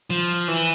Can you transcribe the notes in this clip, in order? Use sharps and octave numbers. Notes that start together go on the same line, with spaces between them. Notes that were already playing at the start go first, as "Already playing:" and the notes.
F3
E3